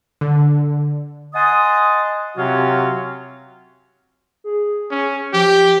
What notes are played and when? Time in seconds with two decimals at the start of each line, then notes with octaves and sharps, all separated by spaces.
0.21 D3
1.34 D#5 F#5 G#5 A5 C6 D#6
2.37 C3 F#3 C4 C#4 F4 F#4
4.44 G#4
4.91 C#4
5.33 F3 G4